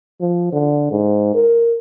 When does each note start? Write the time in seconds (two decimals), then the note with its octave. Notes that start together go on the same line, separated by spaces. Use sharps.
0.21 F3
0.53 D3
0.92 G#2
1.35 A#4